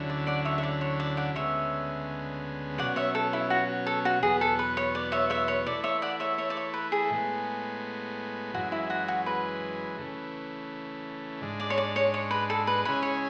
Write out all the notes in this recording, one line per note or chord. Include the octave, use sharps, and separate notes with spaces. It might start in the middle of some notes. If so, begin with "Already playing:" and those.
Already playing: D2 D3 F#3 C#4 E4
D5
D5 F#5
C#5 E5
E5
D5
C#5
D5
D5 F#5
D2 C#3 G#3 B3 C#5 E5
B2 F#3 C#4 D5 F#5
C#5 E5
A4
E4
F#4
A4
F#4
E2 B2 F#3 B3 G#4
A4
B4
C#5
D5
C#5 E5
C#5 E5
C#5
E3 A3 E4 D5
C#5 E5
D5 F#5
C#5 E5
C#5 E5
D5
C#5
B4
G#4
A2 G#3 B3
F#2 E3 G#3 F#4
E4
F#4
F#4
B4
C#3 E3 A3
G#2 G#3 D4
D5
C#5
D5
C#5
C#5
B4
A4
B4
C#3 G#3 C#4 E4 G#4 B4
C#5